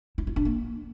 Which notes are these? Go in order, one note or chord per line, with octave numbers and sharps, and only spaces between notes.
E4
F4
D4
A#3